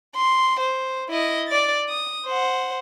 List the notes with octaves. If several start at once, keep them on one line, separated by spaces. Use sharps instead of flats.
C6
C5
E4 D#5
D5 A6
D#6
C5 F#5